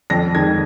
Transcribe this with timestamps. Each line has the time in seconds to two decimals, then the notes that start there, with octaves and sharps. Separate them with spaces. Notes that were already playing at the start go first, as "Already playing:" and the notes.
0.10 F2 A#6
0.35 D#3 G#3 G#6